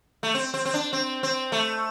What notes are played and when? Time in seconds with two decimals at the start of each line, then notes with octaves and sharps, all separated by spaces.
0.23 A3
0.34 C4
0.54 C4
0.65 C4
0.74 D4
0.93 C4
1.23 C4
1.52 A3